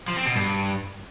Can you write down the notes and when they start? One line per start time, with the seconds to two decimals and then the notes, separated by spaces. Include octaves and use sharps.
0.08 F3
0.17 C4
0.26 B2
0.35 G2